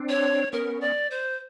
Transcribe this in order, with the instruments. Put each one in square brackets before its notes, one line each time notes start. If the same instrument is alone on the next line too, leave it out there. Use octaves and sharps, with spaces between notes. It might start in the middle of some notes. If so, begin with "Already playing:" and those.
Already playing: [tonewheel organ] C4 D4
[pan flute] C#5
[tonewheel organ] B3 C#4 [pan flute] A#4
[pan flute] D5
C5